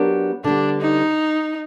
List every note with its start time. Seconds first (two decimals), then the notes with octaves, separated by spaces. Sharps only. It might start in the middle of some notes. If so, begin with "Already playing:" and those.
Already playing: F#3 B3 D4 G4 A#4
0.44 D3 G3 B3 D4
0.81 D#4